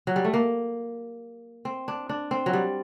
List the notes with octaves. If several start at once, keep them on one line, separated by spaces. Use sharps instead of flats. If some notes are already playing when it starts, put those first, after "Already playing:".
F#3
G3
A3
A#3
C4
D4
D4
C4
F#3
G3